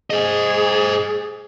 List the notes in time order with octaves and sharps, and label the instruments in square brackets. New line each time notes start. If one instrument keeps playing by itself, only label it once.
[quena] G#4 [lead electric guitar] C5 D#5